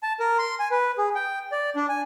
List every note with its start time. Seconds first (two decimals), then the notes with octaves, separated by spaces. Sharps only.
0.03 A5
0.20 A#4
0.38 C6
0.60 G#5
0.71 B4
0.98 G#4
1.15 G5
1.52 D5
1.76 D4
1.89 G#5